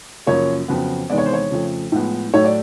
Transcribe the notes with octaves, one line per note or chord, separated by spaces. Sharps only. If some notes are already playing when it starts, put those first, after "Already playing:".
F#2 C#3 F3 A#3 C#5
F2 C#3 F#3 B3
E2 C3 D#3 G#3 B3 D5
C#5
C5
C#5
F2 C#3 F3 A3
A2 F3 G#3 B3
A2 F#3 A3 C#5
D5